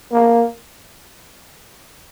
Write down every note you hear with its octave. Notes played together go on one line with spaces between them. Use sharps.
A#3